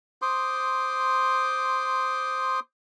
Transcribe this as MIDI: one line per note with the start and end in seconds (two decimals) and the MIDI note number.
0.22 2.60 72
0.22 2.60 84
0.22 2.60 86
0.22 2.60 87